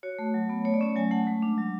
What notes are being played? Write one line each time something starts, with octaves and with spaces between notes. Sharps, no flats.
F#4 C#5
A3
F#3
B3
A3 C#5
D5
C#4 C#5
F#3 G#5
A3 F#5
G#3
D4
F#3